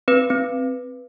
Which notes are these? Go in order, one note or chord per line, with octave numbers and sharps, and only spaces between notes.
C4 B4
C4